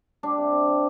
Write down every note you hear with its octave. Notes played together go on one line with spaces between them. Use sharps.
G3 D4
C3
C3
G3